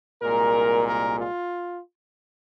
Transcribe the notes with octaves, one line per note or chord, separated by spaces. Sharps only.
C2 A#2 G#3 A#4
A#4
F4